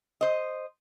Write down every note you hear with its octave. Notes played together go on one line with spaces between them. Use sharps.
C5 D#5